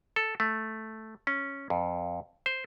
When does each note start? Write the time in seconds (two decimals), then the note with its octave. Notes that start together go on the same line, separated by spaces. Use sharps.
0.16 A4
0.40 A3
1.27 C#4
1.70 F2
2.46 C5